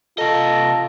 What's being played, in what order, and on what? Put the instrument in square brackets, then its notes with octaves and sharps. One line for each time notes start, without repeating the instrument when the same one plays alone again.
[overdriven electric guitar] C3 D#5 [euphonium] F4 [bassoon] A4 [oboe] A#5